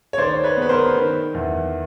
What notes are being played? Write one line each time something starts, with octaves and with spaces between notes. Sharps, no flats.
C#5
D#3 C5 D5
B4 C#5
B3
B4
A#4 C5
D#3
E2